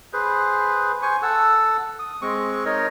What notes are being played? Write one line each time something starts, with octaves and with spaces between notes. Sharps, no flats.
G#4 B4 C5
C5 G#5 C#6
A4 F#5 E6
D#6
G#3 C4 C#6
D#4 A#4 C#5 D#5